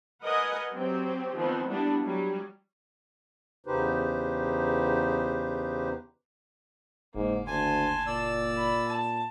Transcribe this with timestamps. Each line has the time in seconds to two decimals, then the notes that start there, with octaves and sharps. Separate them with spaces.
0.22 A#4 B4 D#5 F#5 G#5
0.74 F#3 C4 G4
1.36 D#3 F3 B3 C4
1.69 G3 B3 D4 E4
2.02 F#3 G3
3.67 E2 C#3 D#4 G4 B4 C5
7.15 F#1 G#2 A#3
7.47 D2 G#5 A5 C6
8.07 A#2 D5 E6
8.57 B5
8.89 A5